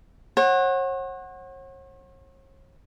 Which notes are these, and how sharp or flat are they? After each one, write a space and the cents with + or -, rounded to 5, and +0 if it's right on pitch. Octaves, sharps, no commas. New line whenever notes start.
C#5 -45 F#5 +0